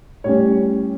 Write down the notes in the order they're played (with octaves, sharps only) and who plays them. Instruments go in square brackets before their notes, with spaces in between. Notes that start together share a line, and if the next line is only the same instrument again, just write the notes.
[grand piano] A2 G3 C#4 C#5